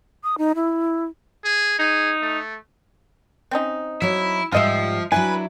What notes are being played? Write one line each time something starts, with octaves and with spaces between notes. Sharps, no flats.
D#6
D#4
E4
G#4
D#4 G#4
A3
C4 C#4 D#4
F#3 E4 C#5
G#2 F3 G3 F4 D#5 E5
F#3 D4 E4 B4 G#5